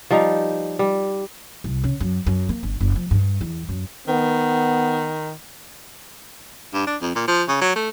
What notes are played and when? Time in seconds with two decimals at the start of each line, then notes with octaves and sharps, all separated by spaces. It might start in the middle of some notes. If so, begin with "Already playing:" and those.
0.10 F3 G3 D#4
0.79 G3
1.64 C2
1.84 C#3
2.00 F#2
2.26 F#2
2.49 A#3
2.63 G1
2.80 F#1
2.96 F3
3.11 G2
3.41 E2
3.69 F#2
4.08 D#3 B3
6.74 G2
6.87 D4
7.01 F2
7.15 A#2
7.27 F3
7.48 C#3
7.61 F#3
7.76 A3